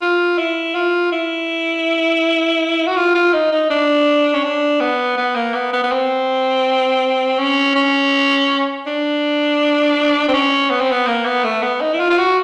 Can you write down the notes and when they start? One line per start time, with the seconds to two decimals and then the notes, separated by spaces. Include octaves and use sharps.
0.02 F4
0.38 E4
0.75 F4
1.12 E4
2.87 F#4
2.96 F4
3.15 F4
3.33 D#4
3.52 D#4
3.70 D4
4.34 C#4
4.44 D4
4.80 B3
5.17 B3
5.36 A#3
5.54 B3
5.73 B3
5.84 B3
5.91 C4
7.39 C#4
7.76 C#4
8.86 D4
10.28 C4
10.34 C#4
10.70 B3
10.81 C4
10.91 B3
11.07 A#3
11.26 B3
11.44 A3
11.63 B3
11.81 D#4
11.94 E4
12.00 F4
12.10 F4
12.18 F#4